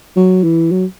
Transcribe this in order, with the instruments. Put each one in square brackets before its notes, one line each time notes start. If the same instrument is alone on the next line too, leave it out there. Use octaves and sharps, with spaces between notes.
[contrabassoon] F#3
E3
F#3